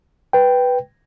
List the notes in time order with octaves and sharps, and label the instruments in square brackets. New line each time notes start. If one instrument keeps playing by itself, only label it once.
[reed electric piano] B4 G5